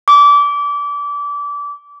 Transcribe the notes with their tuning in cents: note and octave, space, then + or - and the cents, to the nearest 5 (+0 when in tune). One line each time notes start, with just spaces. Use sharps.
D6 -25